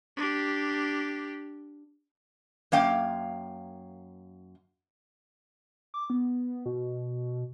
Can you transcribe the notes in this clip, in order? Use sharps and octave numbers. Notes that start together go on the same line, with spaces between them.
D4 G4
F#2 A#3 F5 G5
D6
B3
B2